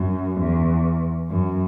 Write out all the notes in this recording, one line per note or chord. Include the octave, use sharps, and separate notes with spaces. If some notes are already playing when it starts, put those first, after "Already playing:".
Already playing: F#2
E2
F#2